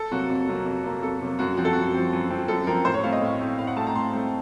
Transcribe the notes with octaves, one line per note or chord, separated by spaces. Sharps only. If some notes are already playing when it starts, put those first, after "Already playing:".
Already playing: A4
C3 F#3 A#3 F#4
F2
C3 F#3 A#3
F2
C3 F#3 A#3
F2 A4
C3 F#3 A#3
F#2 F#4
F3 C4 F#4
A4
F#2 F#4
F3 C4
F#2
F3 C4
F#2 A4
F3 C4 A#4
A2 C5
C#5
A3 C4 F5
D#5
A2
A3 C4
A2 F5
F#5
A3 C4 A5
A#5
A2 C6
A3 C4